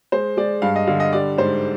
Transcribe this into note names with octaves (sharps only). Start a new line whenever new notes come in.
G#3 C5
G#3 D5
G2 F5
D#5
D3 F5
D#5
G3 D5
G#2 C5